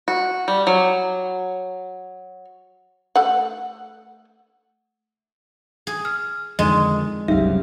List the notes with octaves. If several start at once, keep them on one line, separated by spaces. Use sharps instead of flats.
F#4
G3
F#3
A3 F#5
G#4
F6
F2 D3 D#3 G#3 D#5
F#1 C2 F#2 D#4 G4 E5 F5